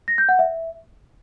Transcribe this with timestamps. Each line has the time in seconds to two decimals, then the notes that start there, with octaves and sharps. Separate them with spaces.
0.08 A#6
0.18 G6
0.29 F#5
0.39 E5